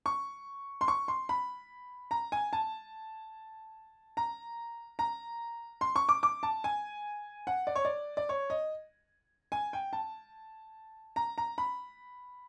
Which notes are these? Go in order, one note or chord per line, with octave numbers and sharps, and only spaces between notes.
C#6
C6
C#6
C6
B5
A#5
G#5
A5
A#5
A#5
C6
C#6
D6
D6
A5
G#5
F#5
D5
C#5
D5
D5
C#5
D#5
G#5
G5
A5
A#5
A#5
B5